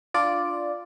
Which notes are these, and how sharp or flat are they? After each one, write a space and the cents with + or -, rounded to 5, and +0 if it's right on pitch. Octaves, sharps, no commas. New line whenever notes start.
D4 +0 F4 +0 D5 +0